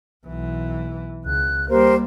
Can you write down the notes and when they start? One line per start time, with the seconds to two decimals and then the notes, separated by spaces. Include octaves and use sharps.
0.26 B1 E3
1.24 C#2 F#6
1.69 G3 A#3 G4 A#4 C5